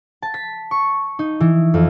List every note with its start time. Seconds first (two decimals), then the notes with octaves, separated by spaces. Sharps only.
0.22 A5
0.34 B6
0.71 C#6
1.19 D#4
1.40 E3
1.74 F2